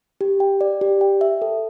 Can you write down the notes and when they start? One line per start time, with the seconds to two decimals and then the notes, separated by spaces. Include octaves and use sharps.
0.21 G4
0.40 G5
0.61 D5
0.81 G4
1.01 G5
1.21 E5
1.42 A4